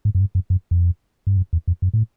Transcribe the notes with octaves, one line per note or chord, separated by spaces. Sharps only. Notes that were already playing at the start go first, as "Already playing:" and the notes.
G#2
F#2
G2
F#2
F#2
F2
G2
F#2
E2
F2
F#2
A2